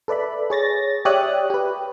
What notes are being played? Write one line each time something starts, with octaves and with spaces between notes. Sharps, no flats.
A4 B4 D5 E5 B5
G#4 C#5 A6 A#6
G4 C#5 D5 E5 D#6 F#6
G4 B4